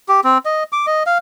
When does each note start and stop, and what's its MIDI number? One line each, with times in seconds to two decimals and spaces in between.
0.09 0.21 67
0.24 0.38 60
0.45 0.63 75
0.73 0.86 86
0.87 1.03 75
1.07 1.18 77